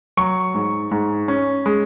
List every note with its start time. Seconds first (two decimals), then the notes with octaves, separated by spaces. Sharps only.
0.17 F#3 C#6
0.55 G#2
0.91 G#2
1.28 C#4
1.66 G#3